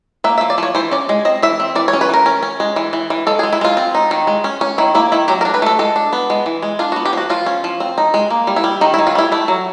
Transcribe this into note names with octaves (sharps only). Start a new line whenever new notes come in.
A#3 E5
E5
F3
D5
F3 C#5
E3 C5
C#4 D5
G#3
C4 D#5
E3 E5
C4
E3 D5
C#5
C#4
B4
E3 A#4
C#4
C#4
G#3
E3
E3
E3
G#3 A4
G#4
G#3
E4
G#3 F4
C4
D#4
D#3
G#3
C#4
C#4
D#3 E4
A#3 E4
D#3 E4
F#3 G4
A#4
D4
B4
A3 A4
G#3 A4
D4
B3
G#3
E3
G#3
D4 F4
F#4
B3
G4
F3 F#4
F3 F4
C#4
F3
C4
D#4
G#3
A#3
G3
E4
G3
D#3 D#4
E4
D#3
F4
G3 E4
A3 E4
F#3